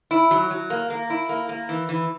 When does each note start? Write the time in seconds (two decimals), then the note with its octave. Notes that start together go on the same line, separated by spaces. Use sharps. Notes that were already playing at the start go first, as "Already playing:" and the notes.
0.11 E4
0.31 F#3
0.50 F#3
0.70 A#3
0.90 A#3
1.10 E4
1.29 A#3
1.49 A#3
1.69 E3
1.89 E3